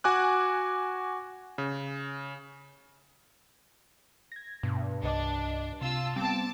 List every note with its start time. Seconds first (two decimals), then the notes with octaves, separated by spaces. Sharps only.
0.04 F#4 G#5 D6 F#6
1.58 C#3
4.32 G#6 A#6
4.63 G2 B2
5.03 C2 D4 D#5 D6
5.81 C3 F4 A5 E6
6.16 G3 B3 C4 A5 D6